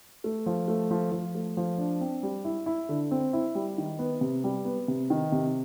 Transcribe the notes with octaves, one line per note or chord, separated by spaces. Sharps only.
A3
F3
A3
F3
F3
A3
F3
D4
C4
G3
E4
E4
D3
C4
E4
G3
D#3
B3
C3
G3
B3
C3
D#3
C3